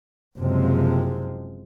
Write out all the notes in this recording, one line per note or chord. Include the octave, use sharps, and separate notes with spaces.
F#1 C3 F3 G#3 C4